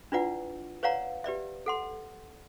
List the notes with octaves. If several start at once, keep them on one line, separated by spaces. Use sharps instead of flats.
D4 E4 F4 B4 D5 F#5
B4 C#5 D5 F5 F#5 A#5
G4 B4 D5 E5
A4 F#5 C6